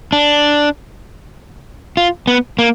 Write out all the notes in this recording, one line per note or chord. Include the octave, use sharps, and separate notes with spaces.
D4
F4
B3
A#3